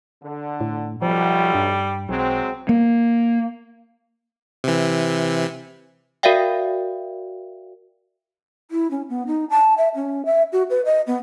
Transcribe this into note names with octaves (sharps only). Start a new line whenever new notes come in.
D3
A2
B1 F3 G3
G2
B1 F#3 G#3 C4
A#3
C3 E3
F#4 A#4 D5 E5 F5 G5
E4
C#4
B3
D#4
A5
E5
C#4
E5
F#4
B4
D#5
B3